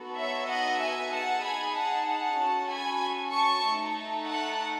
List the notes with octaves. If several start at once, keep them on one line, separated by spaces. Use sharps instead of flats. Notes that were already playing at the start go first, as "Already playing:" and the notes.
Already playing: B3 D#4 F#4 A4
C#5 E5
D#5 F#5
E5 G#5
D#4 G#4 F#5 A5
G#5 B5
F#5 A5
F#5 A5
C#4 F#4 A4
G#5 B5
A5 C#6
A3 D#4 A4
F#5 A5